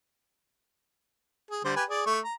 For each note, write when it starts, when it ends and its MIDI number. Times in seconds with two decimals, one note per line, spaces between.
1.51 1.63 68
1.65 1.76 50
1.65 1.76 55
1.65 1.76 72
1.76 1.84 67
1.76 1.84 71
1.76 1.84 80
1.89 2.03 68
1.89 2.03 74
2.06 2.19 57
2.06 2.19 85
2.24 2.34 82